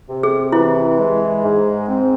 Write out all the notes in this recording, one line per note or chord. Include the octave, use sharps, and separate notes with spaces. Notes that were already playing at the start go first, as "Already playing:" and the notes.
C3
G#4
E3 E4
G#3
G#2
C4